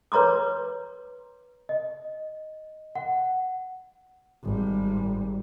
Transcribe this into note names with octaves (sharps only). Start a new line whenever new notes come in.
B4 C#5 A#5 C6 D6
D#5
F#5
G#1 G3